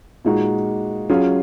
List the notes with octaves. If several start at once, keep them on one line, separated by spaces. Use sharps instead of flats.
A#2 G#3 D#4 F#4
F#3 C#4 F4 G#4